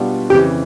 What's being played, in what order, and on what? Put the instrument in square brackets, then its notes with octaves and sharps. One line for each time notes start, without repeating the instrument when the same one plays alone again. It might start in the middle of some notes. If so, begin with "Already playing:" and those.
Already playing: [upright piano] B2 G3 B3 D4 F4
[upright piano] F2 C#3 E3 [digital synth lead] G4